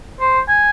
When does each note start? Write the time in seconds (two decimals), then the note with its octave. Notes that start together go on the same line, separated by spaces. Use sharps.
0.20 C5
0.48 G#5